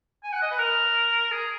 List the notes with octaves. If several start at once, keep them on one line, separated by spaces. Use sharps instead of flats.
G#5
F#5
D#5
B4
A#4
G#4